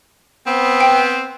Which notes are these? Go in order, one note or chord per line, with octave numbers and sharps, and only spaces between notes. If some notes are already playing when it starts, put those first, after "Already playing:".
B3 C4
G5